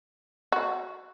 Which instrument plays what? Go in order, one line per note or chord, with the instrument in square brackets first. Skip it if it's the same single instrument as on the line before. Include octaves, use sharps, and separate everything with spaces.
[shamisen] F#4